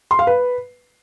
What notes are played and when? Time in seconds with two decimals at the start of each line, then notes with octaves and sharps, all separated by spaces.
0.11 C6
0.19 F5
0.27 B4